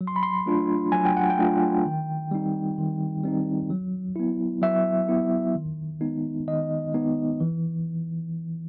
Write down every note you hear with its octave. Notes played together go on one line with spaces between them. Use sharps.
F#3
C6
B5
C6
A3 D4 F4
F#3 G#5
G5
F#5
G5
A3 D4 F4
D#3
G3 C4 D#4
D#3
G3 C4 D#4
F#3
B3 E4
F#3 E5
B3 E4
D#3
G#3 B3 D#4
D#3 D#5
G#3 B3 D#4
E3